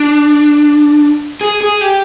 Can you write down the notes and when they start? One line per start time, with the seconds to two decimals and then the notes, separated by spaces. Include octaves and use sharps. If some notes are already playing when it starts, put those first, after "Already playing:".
Already playing: D4
1.41 G#4
1.61 G#4
1.81 G4